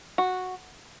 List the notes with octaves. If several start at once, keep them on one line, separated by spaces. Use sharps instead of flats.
F#4